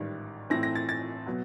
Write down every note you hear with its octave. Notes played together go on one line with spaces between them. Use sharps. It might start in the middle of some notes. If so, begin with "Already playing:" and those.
Already playing: A1 G#2 D#3 G3
A2 E3 A3 C4 A#6
A#6
A6
A6
B2 F#3